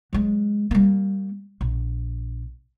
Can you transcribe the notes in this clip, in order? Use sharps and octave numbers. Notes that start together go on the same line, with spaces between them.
F#3 G#3
G3 A#3
A#1